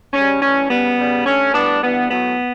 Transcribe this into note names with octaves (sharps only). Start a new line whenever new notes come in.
C#3 G3 C#4
A2 E3 G3 C#4
C#3 G3 B3
C#3 G3
G2 D3 A3 C#4
A2 G3 B3 D4
G2 E3 G3 B3
A2 F#3 A3 B3